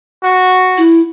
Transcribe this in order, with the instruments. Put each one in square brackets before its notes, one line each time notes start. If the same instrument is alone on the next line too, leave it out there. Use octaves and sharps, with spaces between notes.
[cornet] F#4
[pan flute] E4